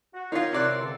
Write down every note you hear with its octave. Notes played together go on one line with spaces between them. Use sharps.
F#4
D#4 F4 A#4 C#5 C6
C3 D5 F#6
C#2 D3 A4